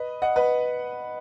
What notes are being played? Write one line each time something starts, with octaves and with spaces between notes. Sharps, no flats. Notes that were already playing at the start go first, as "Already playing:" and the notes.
Already playing: B4 D#5
D#5 F#5
B4 D#5